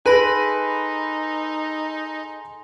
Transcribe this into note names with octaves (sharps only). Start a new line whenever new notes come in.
D#4 G#4 A4 B4 G#5 C6 A#6